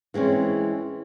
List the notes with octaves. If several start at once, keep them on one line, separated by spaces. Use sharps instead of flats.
E3 G#3 C4 C#4